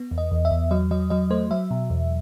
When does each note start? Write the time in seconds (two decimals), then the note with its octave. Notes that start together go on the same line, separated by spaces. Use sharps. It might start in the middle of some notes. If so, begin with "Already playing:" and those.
Already playing: B3
0.11 E2
0.18 D#5
0.31 E2
0.45 E5
0.51 E2
0.71 F#3 D#5
0.91 F#3 D#5
1.10 F#3 D#5
1.30 A3 C5
1.51 F#3 E5
1.71 B2
1.90 E2